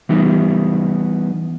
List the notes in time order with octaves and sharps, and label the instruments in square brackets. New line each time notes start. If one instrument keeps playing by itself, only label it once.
[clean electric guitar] E3 G3 B3 D#4